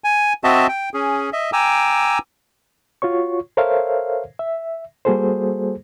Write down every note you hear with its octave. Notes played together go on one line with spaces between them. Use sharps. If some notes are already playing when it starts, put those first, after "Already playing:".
G#5
C4 F#4 D#5 E5 A5
G5
C#4 G#4
D#5 E5
G5 G#5 A#5 D6 E6
F4 F#4 C#5 C#6
A4 A#4 C5 C#5 E5 F5
E5
G3 A#3 F#4 G#4 A4 C5